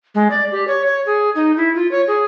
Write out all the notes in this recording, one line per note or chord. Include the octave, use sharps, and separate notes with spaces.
G#3
D5
G4
C#5
C#5
G#4
D#4
E4
F4
C#5
G#4